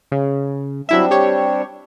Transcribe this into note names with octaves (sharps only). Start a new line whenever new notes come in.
C#3
F#3 G3 C4 D4 E4 E5
G4 C#5